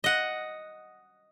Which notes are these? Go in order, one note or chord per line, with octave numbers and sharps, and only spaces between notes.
D#5 F#5